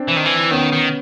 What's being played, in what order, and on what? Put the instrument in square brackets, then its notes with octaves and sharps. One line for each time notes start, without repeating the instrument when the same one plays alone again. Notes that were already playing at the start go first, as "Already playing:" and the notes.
Already playing: [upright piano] C4 D4
[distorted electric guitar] E3
D#3
E3
[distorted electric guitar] D#3 [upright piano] B3 C#4
[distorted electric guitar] D#3